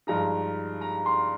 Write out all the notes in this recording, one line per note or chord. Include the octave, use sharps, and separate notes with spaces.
G2 F3 G#3 D#4 A#5
A#5
C6